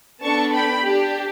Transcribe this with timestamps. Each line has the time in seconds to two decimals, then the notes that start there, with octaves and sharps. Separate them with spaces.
0.21 B3 D4 A4 A5 C#6
0.53 G5 B5
0.83 D4 G4